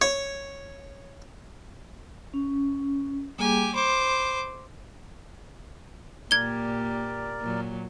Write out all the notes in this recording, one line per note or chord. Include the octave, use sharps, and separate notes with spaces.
C#5
C#4
G3 A#3 G4 G#4 G#5
C5 B5 D6
A#2 A#3 G4 A#4 D5 G#6 G7
A#2 F#3